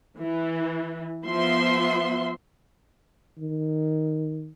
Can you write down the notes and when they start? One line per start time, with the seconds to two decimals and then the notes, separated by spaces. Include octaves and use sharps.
0.20 E3
1.26 F3 B3 E5 C6
3.38 D#3